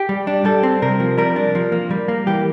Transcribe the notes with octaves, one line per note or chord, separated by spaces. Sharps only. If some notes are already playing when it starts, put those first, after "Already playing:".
Already playing: G4
G3
D4
G3 A4
C4
C3 A#4
F3
G3 A#4
D4
F3
A#3
G3
A#3
E3 G4